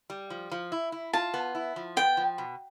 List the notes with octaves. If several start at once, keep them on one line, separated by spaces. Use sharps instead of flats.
G3
F3
F3
E4
E4
F4 A5
B3
E4
F3
B3 G5
F3
B2